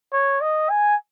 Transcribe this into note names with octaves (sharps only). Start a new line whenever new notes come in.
C#5
D#5
G#5